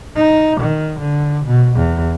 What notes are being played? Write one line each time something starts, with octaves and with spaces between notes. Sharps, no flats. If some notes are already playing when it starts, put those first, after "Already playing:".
D#4
D#3
D3
B2
E2